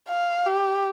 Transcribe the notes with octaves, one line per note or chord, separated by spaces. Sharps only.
F5
G4